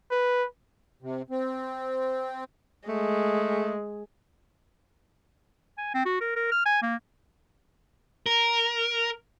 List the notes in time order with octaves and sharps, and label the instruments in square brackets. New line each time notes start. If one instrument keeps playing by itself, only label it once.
[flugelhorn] B4
[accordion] C3
C4
[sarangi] G#3 [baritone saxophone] A3
[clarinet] G#5
C4
F#4
A#4
A#4
F6
G#5
A#3
[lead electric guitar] A#4